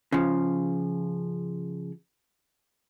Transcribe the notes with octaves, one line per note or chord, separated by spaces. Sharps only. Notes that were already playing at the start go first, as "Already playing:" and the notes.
C#3 F3